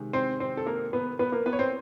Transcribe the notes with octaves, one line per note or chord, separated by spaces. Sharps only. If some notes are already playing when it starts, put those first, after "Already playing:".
Already playing: C3 D#3 G#3
C4 C5
C4 C5
A4
A#3 A#4
B3 B4
B3 B4
A#3 A#4
B3 B4
C#5
C4 C5